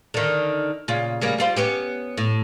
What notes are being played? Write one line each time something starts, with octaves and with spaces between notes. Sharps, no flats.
D3 D#3
A#2 C#3 F4
C#3 G3 A#3
G3 F4 C5
B3 C#4 G4
A2